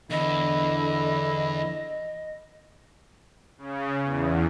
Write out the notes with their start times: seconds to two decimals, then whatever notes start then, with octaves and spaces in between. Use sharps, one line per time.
0.11 E2 D3 E4 D#5
3.58 C#3
4.04 E2